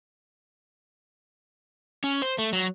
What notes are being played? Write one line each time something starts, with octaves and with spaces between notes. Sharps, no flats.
C#4
C5
A3
F#3